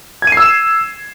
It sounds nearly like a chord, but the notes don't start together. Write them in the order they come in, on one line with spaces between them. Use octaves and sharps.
G#6 D#7 C7 E6 E7